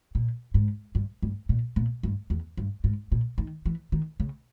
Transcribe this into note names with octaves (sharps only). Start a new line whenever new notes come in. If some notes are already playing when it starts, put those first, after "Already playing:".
A#2
G#2
G2
G2
A#2
A#2
G2
E2
G2
G#2
A#2
D#3
E3
D#3
C#3